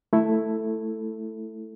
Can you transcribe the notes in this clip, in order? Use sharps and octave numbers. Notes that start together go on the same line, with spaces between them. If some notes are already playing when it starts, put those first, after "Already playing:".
A3 E4 A4